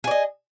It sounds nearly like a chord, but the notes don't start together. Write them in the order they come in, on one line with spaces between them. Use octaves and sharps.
G#4 D5 D#5